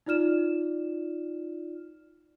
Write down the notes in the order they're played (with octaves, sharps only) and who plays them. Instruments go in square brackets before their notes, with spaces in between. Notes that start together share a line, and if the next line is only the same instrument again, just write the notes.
[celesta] D#4 F4 D5 F6 E7